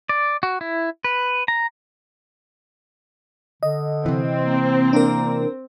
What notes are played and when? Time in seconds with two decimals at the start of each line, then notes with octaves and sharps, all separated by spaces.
0.09 D5
0.43 F#4
0.61 E4
1.04 B4
1.48 A#5
3.63 D3 D#5
4.06 C3 E3 C4
4.44 A#3
4.93 A#3 D4 A#4